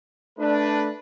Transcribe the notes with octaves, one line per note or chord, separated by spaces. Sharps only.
A3 D4 B4